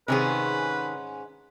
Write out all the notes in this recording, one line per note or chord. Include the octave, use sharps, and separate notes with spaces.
G#2 C3 D#3 C#4 G#4 B4